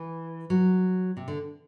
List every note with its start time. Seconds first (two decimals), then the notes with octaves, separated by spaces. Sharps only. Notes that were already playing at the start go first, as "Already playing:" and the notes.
Already playing: E3
0.50 F#3
1.17 C3
1.28 D3